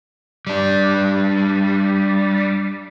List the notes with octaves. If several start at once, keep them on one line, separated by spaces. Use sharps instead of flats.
G3 D4